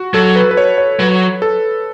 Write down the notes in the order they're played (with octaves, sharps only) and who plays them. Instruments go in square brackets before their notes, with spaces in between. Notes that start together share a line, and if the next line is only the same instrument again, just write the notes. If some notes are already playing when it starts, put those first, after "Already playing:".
Already playing: [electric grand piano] F#4
[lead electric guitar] F#3 [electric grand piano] A4
[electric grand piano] B4
B4
C#5
C#5
[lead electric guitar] F#3 [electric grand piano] B4
[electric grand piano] A4